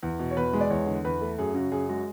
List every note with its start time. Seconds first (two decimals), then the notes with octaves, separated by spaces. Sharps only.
0.03 E2
0.19 B2
0.31 C#5
0.37 E2 B4
0.53 G#3
0.61 D5
0.70 E2 C#5
0.86 D3
1.05 E2 B4
1.21 A3
1.38 F#2 G#4
1.54 C#3 F#4
1.72 F#2 G#4
1.89 G#3 F#4